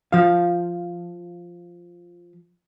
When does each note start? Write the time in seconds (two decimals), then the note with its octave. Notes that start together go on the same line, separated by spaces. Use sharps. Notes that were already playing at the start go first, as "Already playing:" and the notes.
0.12 F3 F5